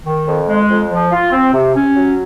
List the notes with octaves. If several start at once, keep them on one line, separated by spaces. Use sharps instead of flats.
D#3
F2
G#3
F2
F3
F4
C4
C3
C#4
F#3